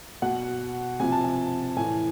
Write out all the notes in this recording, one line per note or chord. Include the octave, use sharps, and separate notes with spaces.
B2 F#5
C3 F3 G#5
A5
G#5
A2 E3 G#5